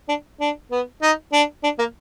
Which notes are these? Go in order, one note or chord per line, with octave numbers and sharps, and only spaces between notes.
D4
D4
B3
D#4
D4
D4
A#3